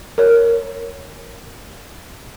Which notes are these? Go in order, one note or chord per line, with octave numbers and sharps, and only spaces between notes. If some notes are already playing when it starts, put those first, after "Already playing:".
A#4 C#5